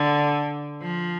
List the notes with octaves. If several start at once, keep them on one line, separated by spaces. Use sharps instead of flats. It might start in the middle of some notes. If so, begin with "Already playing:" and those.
Already playing: D3
F3